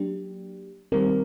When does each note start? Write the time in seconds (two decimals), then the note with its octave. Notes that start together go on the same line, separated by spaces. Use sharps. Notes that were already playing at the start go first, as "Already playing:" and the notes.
Already playing: F#3 A#3 D4 G4
0.92 D#3 G3 C4 A#4